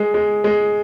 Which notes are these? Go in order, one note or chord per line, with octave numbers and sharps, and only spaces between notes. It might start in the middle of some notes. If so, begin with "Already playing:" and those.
Already playing: G#3
G#3
G#3